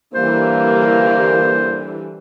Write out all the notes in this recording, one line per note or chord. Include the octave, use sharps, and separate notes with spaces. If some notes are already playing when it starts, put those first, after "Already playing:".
D3 E3 G3 A#3 C5